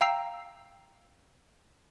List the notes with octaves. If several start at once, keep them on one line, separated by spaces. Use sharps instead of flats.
F5 G5 A#5 E6 C7